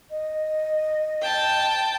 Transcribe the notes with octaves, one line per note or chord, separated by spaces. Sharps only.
D#5
G5 A5